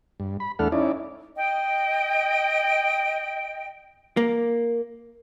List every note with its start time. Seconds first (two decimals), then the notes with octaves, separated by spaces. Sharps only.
0.20 G2
0.40 B5
0.59 E2 A3 D4 A4 F#5 F6
0.72 C#4 D#4 E4 D5
1.36 D#5 G5
4.17 A#3